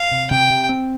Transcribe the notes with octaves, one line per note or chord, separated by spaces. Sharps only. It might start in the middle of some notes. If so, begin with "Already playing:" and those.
Already playing: F5
C3
C3 G5
C3
C4